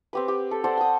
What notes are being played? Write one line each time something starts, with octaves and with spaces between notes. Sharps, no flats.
C4 G4 B4
G4
A4
A4 C5 D5 F#5
G5 D#6